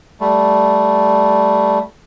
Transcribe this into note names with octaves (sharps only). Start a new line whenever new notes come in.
G3 A3